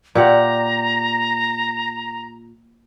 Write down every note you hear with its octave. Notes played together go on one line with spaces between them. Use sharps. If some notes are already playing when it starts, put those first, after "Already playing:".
A#2 G4 F#5 A#5